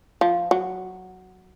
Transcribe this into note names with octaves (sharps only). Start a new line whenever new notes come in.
F3
F#3